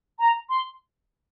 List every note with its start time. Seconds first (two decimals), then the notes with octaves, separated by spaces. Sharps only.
0.19 A#5
0.49 C6